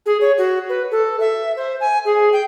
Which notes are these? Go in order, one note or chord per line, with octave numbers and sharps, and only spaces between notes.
G#4
C#5
F#4
B4
A4
E5
C5
G#5
G#4
G5